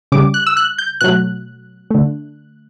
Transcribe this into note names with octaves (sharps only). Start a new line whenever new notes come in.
C#3 G3 D6
F#6
E6
F#6
G6
B2 F#3 A3 F#6
D3 A3